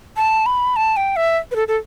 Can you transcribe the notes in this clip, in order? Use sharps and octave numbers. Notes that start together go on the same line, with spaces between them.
A5
B5
A5
G5
E5
B4
A4
A4